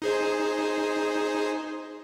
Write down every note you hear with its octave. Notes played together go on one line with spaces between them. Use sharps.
D#4 G#4 C5